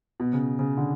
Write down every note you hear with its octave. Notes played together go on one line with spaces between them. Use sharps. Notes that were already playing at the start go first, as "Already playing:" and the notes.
B2
C#3
C#3
D3